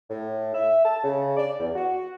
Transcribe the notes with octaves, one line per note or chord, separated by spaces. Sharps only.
A2
E5
A5
C#3
D5
E2
F#4